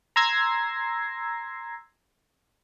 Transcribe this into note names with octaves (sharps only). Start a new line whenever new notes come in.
A#5 C6 E6 G#6 A#6 C7